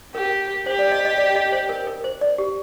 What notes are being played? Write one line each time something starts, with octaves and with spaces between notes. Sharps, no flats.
G4 A#4
G4 C5
D5
D#5
D#5
D5
D#5
C5
A#4
A#4
C5
D5
G4